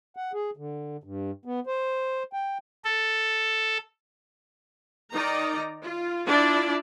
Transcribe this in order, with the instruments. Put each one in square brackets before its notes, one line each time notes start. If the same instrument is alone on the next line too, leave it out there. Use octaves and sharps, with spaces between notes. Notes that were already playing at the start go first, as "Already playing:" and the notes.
[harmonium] F#5
G#4
D3
G2
B3
C5
G5
[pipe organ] A4
[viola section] D#3 D#4 D5 A#5
F4
D4 E4 F4 D5